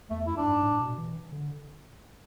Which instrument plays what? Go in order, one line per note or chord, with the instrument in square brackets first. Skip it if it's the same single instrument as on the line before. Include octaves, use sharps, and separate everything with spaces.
[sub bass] E2 [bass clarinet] A3
[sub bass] F#2 [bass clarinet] E4
[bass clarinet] D4
[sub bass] G#2
A2
B2
E3
D3